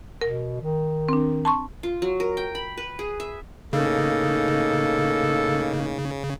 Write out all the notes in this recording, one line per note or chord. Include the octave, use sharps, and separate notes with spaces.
B2 A#4
D#3
C4 D4
A5 C6 C#6
F4
F#3
A#4
G5
B5
B4
G#4
E5
A2 C#3 A#3 D#4 A4